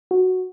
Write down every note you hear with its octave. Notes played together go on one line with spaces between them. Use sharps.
F#4